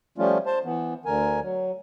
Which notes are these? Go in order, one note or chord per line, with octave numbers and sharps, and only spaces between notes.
F3 G3 A3 C#4 F4
C5 A5
E3 B3
D2 D3 A#4 G#5
F#3